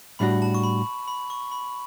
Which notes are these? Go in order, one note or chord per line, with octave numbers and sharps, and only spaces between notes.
A2 G3 D4 F#4 B5
A5
C#6
B5
B5
C#6
B5